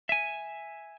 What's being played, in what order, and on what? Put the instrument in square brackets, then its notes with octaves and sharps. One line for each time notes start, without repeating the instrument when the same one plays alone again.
[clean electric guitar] E5 G#5